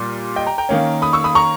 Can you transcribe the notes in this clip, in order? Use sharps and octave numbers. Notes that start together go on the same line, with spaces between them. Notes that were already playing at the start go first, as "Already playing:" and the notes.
Already playing: A#2 G3
D#5 G5
G5 A#5
G5 A#5
D#3 A#3 C#4
B5 D#6
C#6 E6
B5 D#6
A#5 C#6